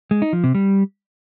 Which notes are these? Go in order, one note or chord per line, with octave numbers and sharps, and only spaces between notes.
G#3
D#4
F3
C3
G3